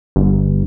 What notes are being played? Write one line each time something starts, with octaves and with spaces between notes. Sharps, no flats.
G1